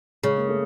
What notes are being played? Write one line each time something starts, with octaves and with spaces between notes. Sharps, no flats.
C#3 G#3
A#3
A3